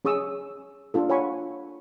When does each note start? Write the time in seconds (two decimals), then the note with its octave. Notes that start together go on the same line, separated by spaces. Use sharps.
0.05 C#4 G#4 C#6 D#6 E6
0.94 D4 F4 A4
1.09 C#5 F#5 G#5 B5 C#6